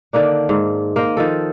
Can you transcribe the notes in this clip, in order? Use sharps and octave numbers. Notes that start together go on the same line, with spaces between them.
D3 D#3 A#3 D4
G#2
A#3 A#4 C5 D#5
D#3 F3 A4